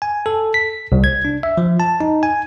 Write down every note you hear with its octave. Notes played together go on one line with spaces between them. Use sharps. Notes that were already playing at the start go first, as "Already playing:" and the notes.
G#5
A4
B6
C2
G#6
D4
E5
F3
A5
D#4
G#5